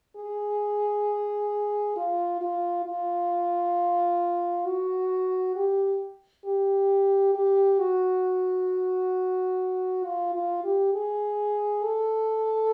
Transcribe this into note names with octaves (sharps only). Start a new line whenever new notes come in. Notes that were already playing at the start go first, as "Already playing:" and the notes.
G#4
F4
F4
F4
F#4
G4
G4
G4
F#4
F4
F4
G4
G#4
A4